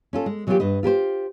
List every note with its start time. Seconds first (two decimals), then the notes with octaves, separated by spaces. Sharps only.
0.13 C#4 F4 A4
0.26 G#3
0.47 E3 F#3 A#3 D#4 F4 G4
0.60 G2 B4 D#5
0.83 F4 G4 A#4 C5